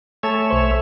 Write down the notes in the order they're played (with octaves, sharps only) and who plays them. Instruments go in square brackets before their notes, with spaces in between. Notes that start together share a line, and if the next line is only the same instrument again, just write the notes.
[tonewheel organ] A3 C#5 E5 [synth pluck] G#5 A5 E7
[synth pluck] B1 C5